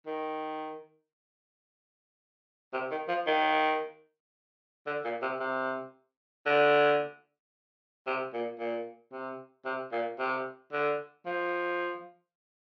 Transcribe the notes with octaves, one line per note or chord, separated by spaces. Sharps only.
D#3
C3
D#3
F3
D#3
D3
A#2
C3
C3
D3
C3
A#2
A#2
C3
C3
A#2
C3
D3
F3